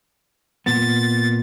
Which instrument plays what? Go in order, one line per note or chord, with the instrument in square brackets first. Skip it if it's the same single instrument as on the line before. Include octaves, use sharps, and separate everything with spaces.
[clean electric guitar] A#2 B3 [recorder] A6